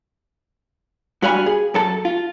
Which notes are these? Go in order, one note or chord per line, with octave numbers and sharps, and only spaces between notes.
G2 F#4 D5 F5 G#5 B5
G#4
F#2 A4 A5
F4